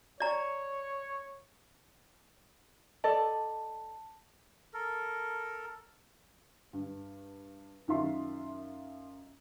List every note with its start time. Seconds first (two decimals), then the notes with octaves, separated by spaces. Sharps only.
0.20 C#5 D5 A#5
3.04 A4 D5 D#5 A5
4.74 A4 A#4
6.73 G2
7.88 F#2 D#3 D#4 F4 E5 C6